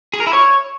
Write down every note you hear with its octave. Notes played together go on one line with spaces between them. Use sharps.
G#4
A#4
E4
C#5